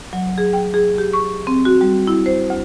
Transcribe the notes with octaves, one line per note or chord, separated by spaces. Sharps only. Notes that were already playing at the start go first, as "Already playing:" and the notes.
F#3
G#4
G5
G#4
G4
C#6
C4
F#4
G3
E4
C5
D2